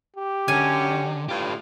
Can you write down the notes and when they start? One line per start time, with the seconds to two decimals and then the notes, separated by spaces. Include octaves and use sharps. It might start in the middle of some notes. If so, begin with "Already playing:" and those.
0.16 G4
0.48 F#2 D3 F#3 C#4 G#5
1.29 A2 F4 G4 B4